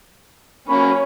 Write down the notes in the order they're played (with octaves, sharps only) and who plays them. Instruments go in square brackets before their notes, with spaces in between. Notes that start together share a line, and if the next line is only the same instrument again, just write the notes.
[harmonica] F#3 A#3 B5 [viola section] C#4